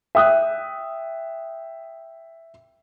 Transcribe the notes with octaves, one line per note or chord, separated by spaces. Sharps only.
E5 G5 D#6 F#6